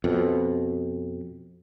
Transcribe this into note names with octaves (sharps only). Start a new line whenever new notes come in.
F2 B2